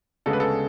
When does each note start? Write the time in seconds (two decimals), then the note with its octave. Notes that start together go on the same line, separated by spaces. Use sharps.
0.26 D2 C#3 G#3 B3 A4
0.33 B4
0.40 A4